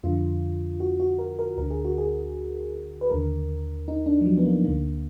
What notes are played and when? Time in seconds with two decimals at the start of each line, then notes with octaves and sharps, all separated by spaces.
0.03 F2 D3 F4
0.80 F#4
1.00 F#4
1.19 A#4
1.39 A#4
1.57 D2 D3 A#4
1.71 G#4
1.85 F#4
1.98 G#4
3.01 B4
3.10 D#2 D3 A#4
3.88 D#4
4.06 D4
4.21 F3
4.26 F#3
4.37 B3
4.45 A#3
4.64 D2 D3 A#3